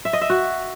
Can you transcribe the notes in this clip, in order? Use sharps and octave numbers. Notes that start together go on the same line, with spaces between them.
E5
D#5
E5
F#4